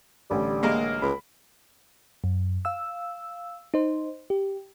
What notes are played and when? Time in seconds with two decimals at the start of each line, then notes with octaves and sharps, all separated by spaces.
0.30 A1 D3 G3
0.63 G#3 A#3 A#4
1.02 C#2 B5
2.24 F#2
2.65 F5 E6
3.74 D#4 C5
4.30 G4